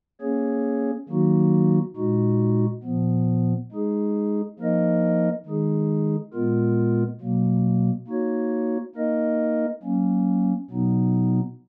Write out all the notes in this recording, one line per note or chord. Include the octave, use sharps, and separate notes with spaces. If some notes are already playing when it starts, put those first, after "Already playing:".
A#3 C#4 G#4 C#5
D#3 F#3 A#3 D#4 F#4
A#2 G#3 D#4 F#4
A#2 F3 B3
G#3 D#4 G#4
F3 A#3 D#4 A#4 D#5
D#3 G#3 D#4 G#4
A#2 G#3 B3 F4 A#4
B2 F#3 A#3
A#3 D#4 F#4 C#5
A#3 D#4 A#4 D#5
F#3 A#3 C#4
B2 F#3 B3 D#4